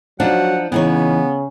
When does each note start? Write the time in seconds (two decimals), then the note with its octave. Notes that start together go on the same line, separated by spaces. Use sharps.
0.20 F3 F#3 D4 D#4 F#5
0.72 C#3 E3 B3 D#4 C#5